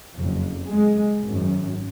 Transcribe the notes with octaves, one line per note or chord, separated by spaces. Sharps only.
F#1 F2
G#3
G#1 F#2